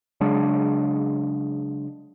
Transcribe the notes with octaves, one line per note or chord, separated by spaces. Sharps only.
C#3 F#3 G#3 D4